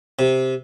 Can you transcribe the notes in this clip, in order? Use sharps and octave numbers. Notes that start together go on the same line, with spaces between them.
C3